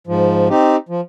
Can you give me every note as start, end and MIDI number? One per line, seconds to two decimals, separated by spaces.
0.07 0.48 44
0.07 0.48 53
0.50 0.76 60
0.50 0.76 63
0.50 0.76 67
0.89 1.01 53